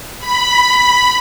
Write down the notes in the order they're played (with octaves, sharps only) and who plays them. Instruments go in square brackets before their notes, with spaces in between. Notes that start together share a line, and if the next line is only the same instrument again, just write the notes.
[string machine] B5